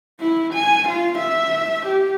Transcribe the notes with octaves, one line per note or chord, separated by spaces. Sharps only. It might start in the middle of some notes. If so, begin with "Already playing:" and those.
E4
G#5
F4
E5
G4